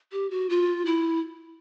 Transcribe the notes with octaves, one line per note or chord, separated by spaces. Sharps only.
G4
F#4
F4
E4